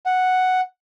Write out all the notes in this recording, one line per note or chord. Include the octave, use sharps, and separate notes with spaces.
F#5